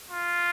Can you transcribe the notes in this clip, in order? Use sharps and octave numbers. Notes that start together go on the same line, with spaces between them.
F4